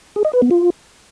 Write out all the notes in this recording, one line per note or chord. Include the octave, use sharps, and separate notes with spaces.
G#4
D#5
B4
B3
F4